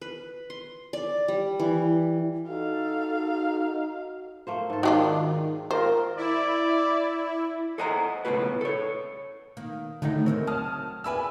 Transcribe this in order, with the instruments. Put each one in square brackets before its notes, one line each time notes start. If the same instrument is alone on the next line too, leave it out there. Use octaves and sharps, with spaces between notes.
[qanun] B4
C6
D5
G3
E3
[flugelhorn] D#4 [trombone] F#4 [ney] A4 [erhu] F5
[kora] A3 A#3 C5
G#2 A4
[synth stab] D#3 [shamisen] F#3 D4 F4 [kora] G#3
[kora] A#3 C4 F4 [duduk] A#4 [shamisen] C5
[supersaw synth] E4 [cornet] D5
[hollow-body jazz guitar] A4 C5 D#5 F#5 G#5 A#5
C#2 A2 B3 F#4 B4
A4 C#5
[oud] D#3 A#3
[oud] A2 F#3 A3 [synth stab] D3 D#3 D#4
[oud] C#3 A#4 C#5 [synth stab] C4
[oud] F#3 [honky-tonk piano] A5 D#6 F6
[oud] D4 E4 B4 [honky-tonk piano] G#5 B5 E6